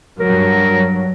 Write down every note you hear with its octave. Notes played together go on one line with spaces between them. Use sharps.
G2 F#3 A#4